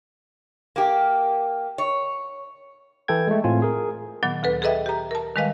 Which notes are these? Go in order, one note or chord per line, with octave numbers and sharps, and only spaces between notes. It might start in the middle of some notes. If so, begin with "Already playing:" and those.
A#3 G4
C#5
E3 E4 A4 G5 G#6
G#3 A3
A2 C4 F4 G#5
G#4 A#4
A#2 D#3 F#3 B3
D2 A4 B4
G#4 A4 B4 D#5 E5 G5
G4 A#5
A#4 A5
D#3 G3 G#3 B4 D#5 F5